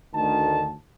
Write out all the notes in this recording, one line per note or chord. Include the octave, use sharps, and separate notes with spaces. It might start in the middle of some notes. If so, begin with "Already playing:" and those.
D2 D#3 A5